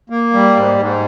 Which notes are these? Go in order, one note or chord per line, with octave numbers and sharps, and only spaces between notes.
A#3
G3
G#2
G#2